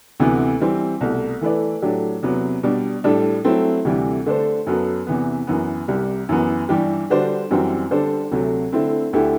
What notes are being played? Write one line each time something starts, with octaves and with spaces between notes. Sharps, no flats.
D2 C3 E3 B3
E3 G3 C4
C2 B2 A3
E3 A3 E4 B4 D5
A2 F#3 A3 D4 G4
E2 C3 F#3 B3
B2 G3 D4
A2 G3 D4 A4
F#3 A3 C4 E4
D2 C3 E3 G3
D3 A3 D4 A4 C5
F#2 F#3 B3 F#4 A4
E2 C3 E3 B3
F#2 E3 B3
C2 C3 G3
F#2 E3 B3
G2 E3 G3 D4 G4
D3 G3 D4 F#4 C5
F#2 E3 G3 C4 F#4
D3 G3 D4 A4 C5
D2 C3 F#3 A3
D3 A3 C4 E4
D2 D3 A3 E4 G4